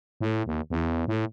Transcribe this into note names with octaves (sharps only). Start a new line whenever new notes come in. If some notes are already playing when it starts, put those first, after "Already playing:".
A2
D#2
E2
A2